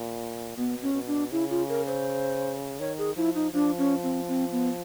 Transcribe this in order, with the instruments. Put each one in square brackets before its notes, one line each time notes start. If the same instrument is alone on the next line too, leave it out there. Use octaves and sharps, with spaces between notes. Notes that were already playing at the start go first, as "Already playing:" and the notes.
Already playing: [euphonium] A#2
[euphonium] B2 [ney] B3
[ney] C#4
[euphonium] B2
[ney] D4
[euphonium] C#3 [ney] E4
[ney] F4
A#4
C5
[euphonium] D#3 [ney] C#5
[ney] G#4
[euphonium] F3 [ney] E4
[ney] D#4
[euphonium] F3 [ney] D4
[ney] C#4
C4
C4
B3